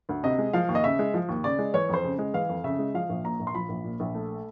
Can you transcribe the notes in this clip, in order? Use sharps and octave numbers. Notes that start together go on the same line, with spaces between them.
D2
C3 D#5
G#3
F3 F5
D#2
D#5
C#3 E5
G#3
F3
D#2
C#3 D5
G#3
E3 C#5
F2 C5
C#3
G#3
E3 F5
F2
C#3 E5
G#3
F3 F5
A#1
A#2 A#5
A#1
C6
F3 B5
A#1
A#2
A#1
A3